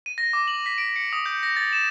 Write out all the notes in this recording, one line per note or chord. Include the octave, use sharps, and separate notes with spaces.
D#7
A#6
D6
F#7
B6
D7
C#7
D#6
G6
A#6
A6
E7